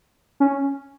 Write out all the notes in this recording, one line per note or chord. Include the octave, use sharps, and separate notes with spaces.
C#4